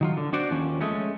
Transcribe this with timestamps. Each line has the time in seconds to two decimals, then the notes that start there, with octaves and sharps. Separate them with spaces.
0.01 D#3 F#3 F4
0.17 D3
0.33 D4 F#4 C5 D5
0.50 D#2 F3 C#4
0.81 G#3 A3 C#4